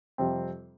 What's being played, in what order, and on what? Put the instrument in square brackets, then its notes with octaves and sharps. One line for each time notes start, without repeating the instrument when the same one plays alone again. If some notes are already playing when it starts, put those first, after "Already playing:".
[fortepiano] F2 C3 G3 C4